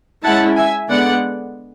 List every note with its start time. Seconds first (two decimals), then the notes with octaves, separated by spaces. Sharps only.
0.24 G#3 C#4 E4 F#5 A5
0.57 E5 G#5
0.89 D3 G#3 B3 D5 F#5